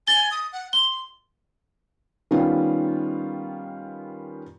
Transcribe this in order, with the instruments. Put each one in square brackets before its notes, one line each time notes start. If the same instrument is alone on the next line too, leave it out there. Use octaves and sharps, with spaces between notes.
[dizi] G#5 [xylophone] A6 G7
[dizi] D#6
F#5
[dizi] C6 [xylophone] G7
[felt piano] D#3 G3 B3 C#4 F4